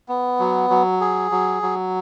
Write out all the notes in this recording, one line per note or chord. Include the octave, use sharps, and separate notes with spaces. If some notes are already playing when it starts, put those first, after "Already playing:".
B3
F#3
F#3
G#4
F#3
F#3